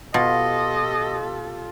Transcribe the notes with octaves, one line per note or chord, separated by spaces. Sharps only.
B2 F4 G4 A4 D#5